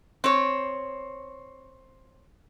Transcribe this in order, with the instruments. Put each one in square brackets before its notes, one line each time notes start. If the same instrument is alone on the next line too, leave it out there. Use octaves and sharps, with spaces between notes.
[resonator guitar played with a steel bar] C4 C#5